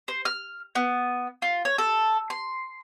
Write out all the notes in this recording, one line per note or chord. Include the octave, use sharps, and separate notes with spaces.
C5
F6
B3
F4
C#5
A4
C6